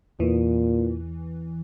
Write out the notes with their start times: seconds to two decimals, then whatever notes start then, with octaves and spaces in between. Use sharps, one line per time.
0.20 E2 A#2 E3